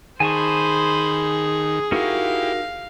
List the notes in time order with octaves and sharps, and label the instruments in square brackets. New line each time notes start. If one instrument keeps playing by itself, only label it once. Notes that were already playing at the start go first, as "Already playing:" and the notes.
[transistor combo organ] D#3 [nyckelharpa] G#4 [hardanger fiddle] C5 B5 [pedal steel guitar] G#5 A5 C#6
[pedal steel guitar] D#4 F#4 A#4 [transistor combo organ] E4 G4 [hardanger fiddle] F5